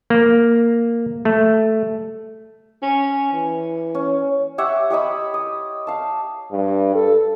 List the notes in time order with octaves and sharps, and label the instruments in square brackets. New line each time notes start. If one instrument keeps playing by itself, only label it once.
[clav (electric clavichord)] A#3
A3
[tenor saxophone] C#4
E3
[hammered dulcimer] C#4
[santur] G4 C#5 E5 F#5
G4 C#5 D#5 B5
D#6
F5 A5
[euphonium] G2
A4